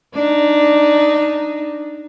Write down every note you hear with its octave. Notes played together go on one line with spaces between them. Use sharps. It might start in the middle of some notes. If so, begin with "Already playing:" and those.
D4 D#4